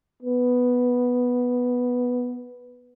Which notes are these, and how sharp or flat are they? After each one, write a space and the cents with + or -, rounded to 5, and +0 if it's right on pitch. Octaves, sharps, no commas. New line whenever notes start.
B3 -5